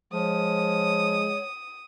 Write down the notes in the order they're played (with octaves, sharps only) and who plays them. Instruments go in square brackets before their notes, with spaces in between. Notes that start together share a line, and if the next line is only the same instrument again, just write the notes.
[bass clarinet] F3 [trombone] G#3 [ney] C#5 [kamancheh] D#6